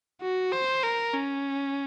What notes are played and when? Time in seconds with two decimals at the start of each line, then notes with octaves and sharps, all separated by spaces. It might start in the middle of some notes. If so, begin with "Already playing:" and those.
0.21 F#4
0.52 C5
0.83 A#4
1.15 C#4